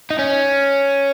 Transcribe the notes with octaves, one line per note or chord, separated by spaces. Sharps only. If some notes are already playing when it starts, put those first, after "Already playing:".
D#4
C#4